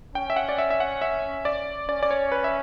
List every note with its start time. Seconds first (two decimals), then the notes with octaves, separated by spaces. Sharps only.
0.15 C#4 G5
0.30 E5
0.36 F#5
0.49 D5
0.58 E5
0.70 E5
0.80 F#5
1.01 E5
1.45 D5
1.89 C#4 D5
2.03 D5
2.11 C#5
2.32 B4
2.44 E5